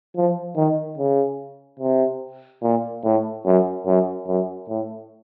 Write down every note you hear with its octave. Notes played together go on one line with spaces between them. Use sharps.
F3
D#3
C#3
C3
A#2
A2
F#2
F#2
F#2
A2